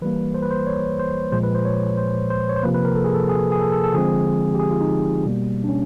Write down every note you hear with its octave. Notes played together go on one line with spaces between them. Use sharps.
E3 G3 A#3 B4
C5
B4
C5
C#5
C5
A#2 F3 G#3 C5
B4
C5
C#5
C5
C5
C#5
C5
C3 F3 A#3 B4
B4
A#4
A4
G#4
A4
G#4
G#4
A4
A4
A4
D3 F3 G#3 C4 G#4
G4
G#4
F4
D#4
B2 G3 A#3
D4
C#4